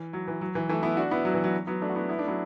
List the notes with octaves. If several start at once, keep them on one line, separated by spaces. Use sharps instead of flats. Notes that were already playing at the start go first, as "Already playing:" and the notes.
Already playing: E3
F#3
E3
F#3
E3
E3 A3
B3 E4
D4 F#4
B3 E4
F#3
E3
F#3
F#3 B3
A3 D4
F#4
B3 E4
B3 E4
A3 D4
F#3 B3